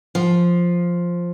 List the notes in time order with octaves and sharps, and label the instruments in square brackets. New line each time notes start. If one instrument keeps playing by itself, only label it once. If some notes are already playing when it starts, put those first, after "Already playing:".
[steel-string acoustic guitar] F3